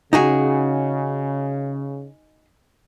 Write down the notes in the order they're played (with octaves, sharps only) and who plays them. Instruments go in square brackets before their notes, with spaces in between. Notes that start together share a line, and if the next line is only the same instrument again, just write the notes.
[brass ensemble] C#3 [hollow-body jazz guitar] D#4 F#4 G#4